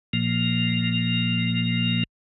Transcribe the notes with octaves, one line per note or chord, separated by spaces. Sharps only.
A#2 F3 A#3